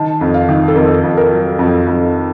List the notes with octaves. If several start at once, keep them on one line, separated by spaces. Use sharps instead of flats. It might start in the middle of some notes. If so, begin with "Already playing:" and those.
Already playing: D#3 A5
F2
F5
D#3
A4
F2 A#4
F2
A#4
F#3
F2
F2